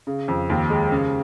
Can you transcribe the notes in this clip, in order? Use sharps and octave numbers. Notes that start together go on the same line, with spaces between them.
C#3
F2
D#2
G#3
C#3